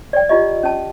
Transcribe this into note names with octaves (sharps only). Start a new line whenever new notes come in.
D5 G5
E4 F4 G4 D#5
C#4 A5